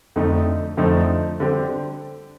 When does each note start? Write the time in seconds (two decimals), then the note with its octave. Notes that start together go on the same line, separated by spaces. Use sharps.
0.16 F2 D3 F3 A3 D#4
0.77 F2 D3 F3 A3 D#4
1.40 D3 G3 C4 G4